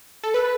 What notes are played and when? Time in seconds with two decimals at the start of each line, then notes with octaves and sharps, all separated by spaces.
0.23 A4
0.34 B4